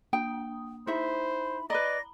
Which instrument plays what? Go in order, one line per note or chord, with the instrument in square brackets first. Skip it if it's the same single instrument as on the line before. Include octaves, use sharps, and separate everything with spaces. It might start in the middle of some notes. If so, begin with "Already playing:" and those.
[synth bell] A#3 D4 D#6 [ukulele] G5
[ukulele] D#4 E5 [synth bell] E4 [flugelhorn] C5 [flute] B5
[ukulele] B4 D#5 [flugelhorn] D5 [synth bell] A#5 B5 [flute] A#6